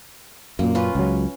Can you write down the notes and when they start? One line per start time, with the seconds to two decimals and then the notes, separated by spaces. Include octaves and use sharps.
0.59 F#2 A#2 A#3
0.75 C#4 F4 B4
0.95 C#2 F#3